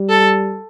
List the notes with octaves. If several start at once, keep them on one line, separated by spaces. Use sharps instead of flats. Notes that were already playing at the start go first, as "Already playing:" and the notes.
Already playing: G3
A4